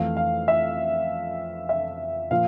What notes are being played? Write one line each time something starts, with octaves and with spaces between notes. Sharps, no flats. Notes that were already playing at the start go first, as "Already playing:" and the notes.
Already playing: F2 E3 A3 F5
F5
E5
E5
A#2 F3 F5